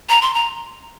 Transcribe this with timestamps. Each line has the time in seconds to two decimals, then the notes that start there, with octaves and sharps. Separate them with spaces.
0.09 A#5
0.22 C6
0.34 A#5